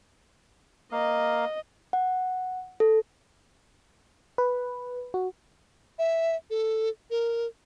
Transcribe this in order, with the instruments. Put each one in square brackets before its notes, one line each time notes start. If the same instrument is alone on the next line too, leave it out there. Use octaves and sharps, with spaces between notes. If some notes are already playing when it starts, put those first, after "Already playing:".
[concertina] A#3 F5 [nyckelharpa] D#5
[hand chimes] F#5
A4
[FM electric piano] B4
F#4
[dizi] E5
A4
A#4